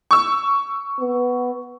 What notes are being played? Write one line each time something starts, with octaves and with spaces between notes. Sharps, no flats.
C#6 E6
B3